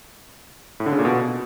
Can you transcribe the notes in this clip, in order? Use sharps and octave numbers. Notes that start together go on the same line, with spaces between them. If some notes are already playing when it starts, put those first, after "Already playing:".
A2
D3
C#3
A#2
B2